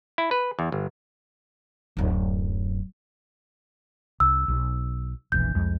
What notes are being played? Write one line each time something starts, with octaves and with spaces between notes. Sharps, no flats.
E4
B4
E2
G1
D1 F#2
C2 E6
B1
E1 A#1 E3 G6
C2 F2 G#3